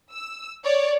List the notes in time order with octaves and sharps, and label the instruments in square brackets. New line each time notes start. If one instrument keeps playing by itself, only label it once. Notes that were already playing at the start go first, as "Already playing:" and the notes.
[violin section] E6
C#5 D5